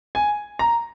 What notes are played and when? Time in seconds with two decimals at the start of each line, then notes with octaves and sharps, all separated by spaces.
0.15 G#5
0.59 A#5